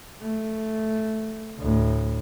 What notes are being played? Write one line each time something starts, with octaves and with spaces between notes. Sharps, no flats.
A3
D2 A2